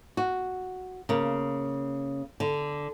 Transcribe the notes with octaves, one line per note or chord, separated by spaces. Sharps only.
F#4
C#3 A#3
D3